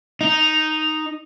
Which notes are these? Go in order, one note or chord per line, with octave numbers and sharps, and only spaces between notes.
D#4